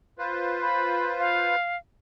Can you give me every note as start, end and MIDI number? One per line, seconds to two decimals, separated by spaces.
0.19 1.55 65
0.19 1.55 71
0.19 1.55 72
0.62 1.12 83
1.19 1.77 77